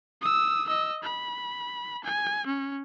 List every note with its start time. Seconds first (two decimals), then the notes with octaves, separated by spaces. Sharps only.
0.21 D#6 E6
0.68 D#5 E6
1.03 B5
2.04 G#5
2.46 C#4